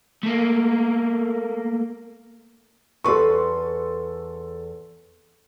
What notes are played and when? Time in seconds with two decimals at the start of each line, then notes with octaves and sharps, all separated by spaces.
0.23 A3 A#3
3.04 E2 A4 B4 C6 C#6